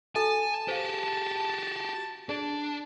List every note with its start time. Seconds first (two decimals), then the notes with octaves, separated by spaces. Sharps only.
0.15 F#4 A4 E5 G#5 A5
0.68 F#4 G4 C5 F5
2.29 D4 G#4 D5